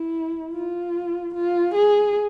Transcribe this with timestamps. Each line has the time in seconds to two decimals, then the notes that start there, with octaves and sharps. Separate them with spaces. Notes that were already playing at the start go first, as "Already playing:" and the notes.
Already playing: E4
0.53 F4
1.34 F4
1.74 G#4